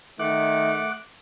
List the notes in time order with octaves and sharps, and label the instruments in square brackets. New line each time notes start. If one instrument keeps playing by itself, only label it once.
[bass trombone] D#3 [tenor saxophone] A3 [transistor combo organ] F#5 D6